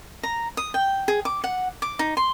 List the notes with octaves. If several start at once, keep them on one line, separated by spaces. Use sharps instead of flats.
A#5
D#6
G5
G#4
D6
F#5
D6
D#4
C6